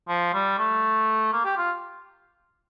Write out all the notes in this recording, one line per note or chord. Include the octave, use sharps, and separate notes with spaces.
F3
G3
A3
A#3
G4
F4